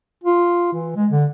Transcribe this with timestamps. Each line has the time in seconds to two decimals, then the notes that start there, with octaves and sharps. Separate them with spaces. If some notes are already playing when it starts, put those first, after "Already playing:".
0.24 F4
0.73 E3
0.96 G#3
1.10 D3